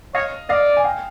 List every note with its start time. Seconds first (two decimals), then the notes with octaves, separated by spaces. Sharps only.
0.15 C#5 D#5 F5
0.49 D5 D#5 F5
0.77 G#5
0.84 F5 G5